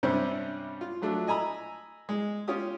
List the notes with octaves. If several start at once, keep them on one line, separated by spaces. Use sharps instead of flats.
G2 C3 G3 C#4 C5 E5
F4
F3 F#3 A3 D4
D#5 G#5 A#5 B5 E6
G#3
C#4 F4 G4 D#6